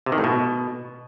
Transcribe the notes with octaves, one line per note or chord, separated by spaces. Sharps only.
C3
D#3
A2
B2